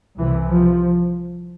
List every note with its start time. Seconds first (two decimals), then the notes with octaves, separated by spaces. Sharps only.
0.18 C2 C3 E3
0.48 F3